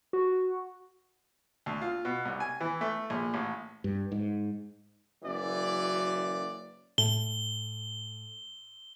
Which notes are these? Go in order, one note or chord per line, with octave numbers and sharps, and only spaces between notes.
F#4
D2
F4
B2
C2
G#5
E3
A3
A#1
A1
G2
G#2
F#1 F#2 E3 F#3 D5
A2 G7